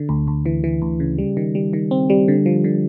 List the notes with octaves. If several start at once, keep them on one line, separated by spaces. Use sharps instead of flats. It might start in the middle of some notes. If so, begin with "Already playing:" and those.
Already playing: D3
D2
D2
E3
E3
D2
C#3
G3
D#3
G3
D#3
C4
G3
D3
F3
D3